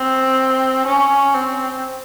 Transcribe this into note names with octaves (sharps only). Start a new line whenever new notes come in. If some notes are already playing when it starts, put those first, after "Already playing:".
Already playing: C4
C#4
C4